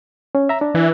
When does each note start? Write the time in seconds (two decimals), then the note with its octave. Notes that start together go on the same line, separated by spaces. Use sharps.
0.35 C#4
0.49 E5 A#5
0.61 D4
0.74 E3